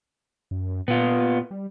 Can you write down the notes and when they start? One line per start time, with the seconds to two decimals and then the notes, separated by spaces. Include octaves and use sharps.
0.51 F#2
0.88 A#2 B3 F4
1.51 G3